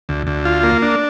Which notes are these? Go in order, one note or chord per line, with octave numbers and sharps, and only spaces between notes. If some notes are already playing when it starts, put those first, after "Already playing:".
D2
D2
F4
A#3
D4